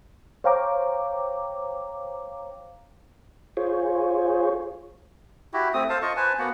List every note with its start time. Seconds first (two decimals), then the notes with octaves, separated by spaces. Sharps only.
0.44 C5 C#5 F5 G5 A#5 D6
3.57 F4 G#4 C5 C#5
5.53 E4 F#4 G4
5.74 A3 C4 D#6
5.89 A4 C5 F5 A5
6.02 F4 D#5 C#6
6.17 B4 C5 G#5 A5
6.39 A#3 B3 F#4 F#5